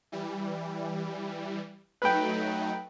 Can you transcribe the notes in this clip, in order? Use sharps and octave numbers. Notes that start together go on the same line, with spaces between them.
E3 G3
F#3 A3 D#4 B4 G5